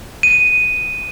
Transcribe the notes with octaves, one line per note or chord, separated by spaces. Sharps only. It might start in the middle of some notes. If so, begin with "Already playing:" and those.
D#7